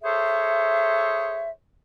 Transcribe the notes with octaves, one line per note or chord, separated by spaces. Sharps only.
G#4 A4 C5 C#5 E5